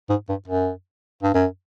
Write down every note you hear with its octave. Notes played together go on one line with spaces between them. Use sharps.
G#2
G2
F#2
G2
F#2